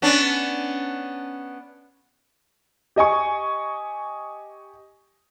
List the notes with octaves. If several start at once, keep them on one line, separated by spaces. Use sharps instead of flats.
B3 C#4 D4
G4 D#5 G#5 C#6